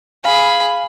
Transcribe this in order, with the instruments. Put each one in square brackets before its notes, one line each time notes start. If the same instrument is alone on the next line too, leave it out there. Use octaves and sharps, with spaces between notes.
[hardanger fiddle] G#4 B5 [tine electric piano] F5